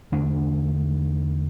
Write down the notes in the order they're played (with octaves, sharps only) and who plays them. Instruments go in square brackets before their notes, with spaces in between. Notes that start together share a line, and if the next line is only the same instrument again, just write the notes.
[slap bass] E2 D3 A3 D4